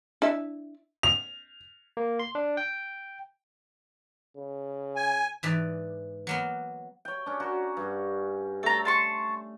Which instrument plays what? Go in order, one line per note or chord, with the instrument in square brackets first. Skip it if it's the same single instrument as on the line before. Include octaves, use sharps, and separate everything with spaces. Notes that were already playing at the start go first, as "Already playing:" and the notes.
[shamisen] D4 E4 E5
[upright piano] F7
[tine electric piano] A#3
C6
D4
G5
[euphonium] C#3
[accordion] G#5
[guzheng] G#2 E3 D5
F#3 A#3 B3
[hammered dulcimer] C#5 G5
C#4 D4
C#4 F#4 A#4
G2
[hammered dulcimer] A3 [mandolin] A4 A#5
[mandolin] A5 C6 C#6